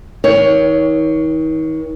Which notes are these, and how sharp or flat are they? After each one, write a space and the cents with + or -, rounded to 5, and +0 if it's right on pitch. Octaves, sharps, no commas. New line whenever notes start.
D#3 +40 C#5 +15